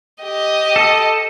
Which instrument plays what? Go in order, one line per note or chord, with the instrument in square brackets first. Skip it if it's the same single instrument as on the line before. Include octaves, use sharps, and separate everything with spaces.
[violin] G4 D#5
[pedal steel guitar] A4